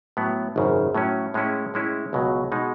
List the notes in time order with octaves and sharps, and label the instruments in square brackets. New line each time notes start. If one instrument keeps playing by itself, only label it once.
[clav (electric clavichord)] A2 F#3 B3
G#1 F#2 C#3
A2 F#3 C#4
A2 G#3 C#4 E4
A2 G#3 C#4 E4
C#2 B2 F#3
B2 G#3 D#4